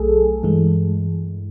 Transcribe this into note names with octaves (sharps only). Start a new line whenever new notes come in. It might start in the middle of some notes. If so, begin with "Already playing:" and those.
Already playing: B1 F#3 A3 G#4 A4
G2 E3 G#3